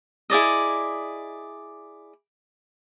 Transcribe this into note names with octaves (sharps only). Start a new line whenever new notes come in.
E4 G#4 D5 D#5